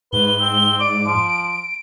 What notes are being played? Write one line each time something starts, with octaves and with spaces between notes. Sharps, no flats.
G#2 B4 G7
C4
D5 D7
F3